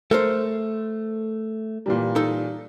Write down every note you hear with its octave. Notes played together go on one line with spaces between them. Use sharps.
A3 A4 A#4 C5
A#2 E3 G3
D#4 A4